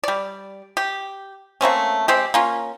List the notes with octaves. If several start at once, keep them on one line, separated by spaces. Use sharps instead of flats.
G3 D5
G4
A3 A#3 C4 C#4
G#3 C4 G4
A#3 C#4 F4